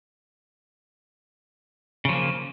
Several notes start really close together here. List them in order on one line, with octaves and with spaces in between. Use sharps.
C#3 F3 A#3